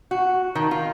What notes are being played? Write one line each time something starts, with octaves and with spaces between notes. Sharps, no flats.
F#4
D#3
F4